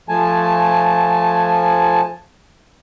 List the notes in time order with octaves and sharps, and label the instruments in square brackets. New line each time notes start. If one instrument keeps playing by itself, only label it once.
[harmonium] F3 A3 G#5 A5